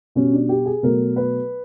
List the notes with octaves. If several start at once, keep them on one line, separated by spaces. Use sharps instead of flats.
B2 G3 C#4
D4
G4
G#4
B2 F#3 A3 A#4
B4